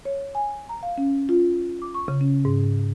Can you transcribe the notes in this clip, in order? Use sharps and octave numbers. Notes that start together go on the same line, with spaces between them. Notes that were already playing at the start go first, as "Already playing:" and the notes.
C#5
G#5
A#5
F5
C#4
F4
D6
C#6
C#3
C#4
G#2